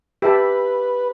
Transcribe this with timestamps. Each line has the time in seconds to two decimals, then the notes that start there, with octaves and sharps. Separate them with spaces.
0.22 G4 B4 E5 A5